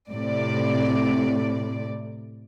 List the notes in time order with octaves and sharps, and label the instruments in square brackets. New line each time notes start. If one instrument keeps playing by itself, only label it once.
[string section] A2 C3 D5